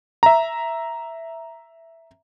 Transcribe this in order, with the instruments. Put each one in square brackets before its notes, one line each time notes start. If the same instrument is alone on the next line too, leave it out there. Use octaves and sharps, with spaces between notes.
[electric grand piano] E5 A#5